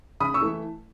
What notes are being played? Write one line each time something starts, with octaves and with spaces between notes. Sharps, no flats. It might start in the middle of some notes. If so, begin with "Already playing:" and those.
C#3 B5 D#6
C#6 E6
E3 A3